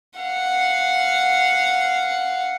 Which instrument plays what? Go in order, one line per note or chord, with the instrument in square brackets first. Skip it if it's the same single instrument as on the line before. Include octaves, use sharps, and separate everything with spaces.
[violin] F5 F#5